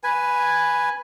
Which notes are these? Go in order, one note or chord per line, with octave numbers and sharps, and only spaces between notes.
B4 G#5